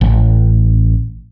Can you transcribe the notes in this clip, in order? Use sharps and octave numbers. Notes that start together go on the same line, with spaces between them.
A1